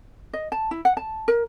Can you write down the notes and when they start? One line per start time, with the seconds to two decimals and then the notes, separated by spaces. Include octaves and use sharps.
0.33 D#5
0.52 A5
0.71 E4
0.85 F#5
0.97 A5
1.28 A#4